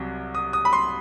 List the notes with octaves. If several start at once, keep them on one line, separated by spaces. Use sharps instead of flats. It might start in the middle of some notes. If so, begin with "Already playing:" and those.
Already playing: C2 C3 F#3
D#6
D#6
B5
C6